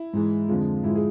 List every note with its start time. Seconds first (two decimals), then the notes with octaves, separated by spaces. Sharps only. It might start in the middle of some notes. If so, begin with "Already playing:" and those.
Already playing: E4
0.13 G#2 E3 G#3
0.48 F2 D3 F3 G#3 F4
0.83 G#2 F3 G#3 E4
0.95 G#4